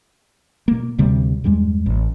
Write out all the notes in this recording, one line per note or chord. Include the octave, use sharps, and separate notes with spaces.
B2 A#3
D2 C3 G3 C4
E2 G2 G3 G#3
A1